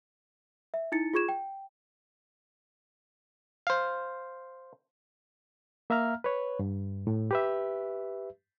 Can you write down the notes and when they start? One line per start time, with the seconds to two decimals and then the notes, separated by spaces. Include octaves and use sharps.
0.74 E5
0.92 D#4 E4 A6 C#7
1.13 F4 G#4 C#6 G#6 E7
1.29 G5
3.67 C5 F5
5.90 A#3 E5 F5 A#5 F6
6.24 B4 C#5
6.59 G2
7.07 A2
7.31 G4 B4 E5